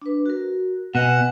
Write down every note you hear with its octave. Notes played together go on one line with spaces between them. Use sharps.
D4 B4
F#4 A#4
B2 B4 D#5 F#5 G#5